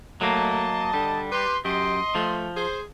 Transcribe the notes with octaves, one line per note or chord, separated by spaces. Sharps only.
F#3 A3 A#3 D#5 A5
D3 G3
G4 B4 C6
F#2 G4 D#5 C6
F3 A3
G#4 C5